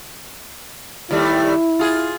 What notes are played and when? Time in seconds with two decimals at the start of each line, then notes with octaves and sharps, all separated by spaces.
1.11 D#2 G3 A3 E4
1.79 F4 G#4